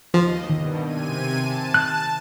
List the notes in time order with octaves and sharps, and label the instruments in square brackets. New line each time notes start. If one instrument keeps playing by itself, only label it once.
[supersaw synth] D#2 D#5 [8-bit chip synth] F3
[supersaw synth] G2 B2 [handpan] D#3
[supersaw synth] C3 G#5 D#7
A5
[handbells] F#6